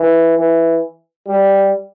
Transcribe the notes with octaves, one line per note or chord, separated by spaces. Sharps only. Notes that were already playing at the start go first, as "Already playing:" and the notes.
Already playing: E3
E3
G3